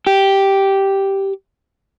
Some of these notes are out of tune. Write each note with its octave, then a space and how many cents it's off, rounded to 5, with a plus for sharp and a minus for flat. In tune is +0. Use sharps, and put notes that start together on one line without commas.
G4 -5